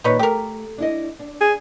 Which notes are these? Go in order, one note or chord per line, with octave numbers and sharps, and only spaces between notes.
A#2 D#3 D#4 B4 C#5
A3 G4 A#4
D4 E4 D#5
D4
G#4